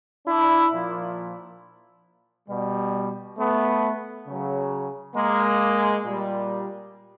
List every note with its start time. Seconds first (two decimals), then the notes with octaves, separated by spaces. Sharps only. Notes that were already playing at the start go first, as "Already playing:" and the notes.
0.26 D4 E4
0.72 A#2 F3
2.48 B2 G3
3.37 A3 B3
4.26 C#3 F#3
5.15 G#3 A#3
6.03 A#2 G3